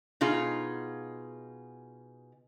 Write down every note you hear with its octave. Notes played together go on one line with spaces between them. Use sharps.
B2 D#4 F4 G#4